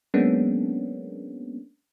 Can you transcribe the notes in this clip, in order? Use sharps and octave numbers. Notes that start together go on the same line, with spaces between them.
F#3 G#3 A#3 B3 C#4 D4